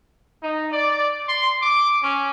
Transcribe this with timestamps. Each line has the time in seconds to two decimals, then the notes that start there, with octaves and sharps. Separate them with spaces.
0.42 D#4
0.71 D5
1.29 C6
1.63 D6
2.03 C#4